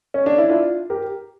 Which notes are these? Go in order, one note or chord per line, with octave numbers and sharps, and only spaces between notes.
C#4
D4
E4
D4 F4
G4 A#4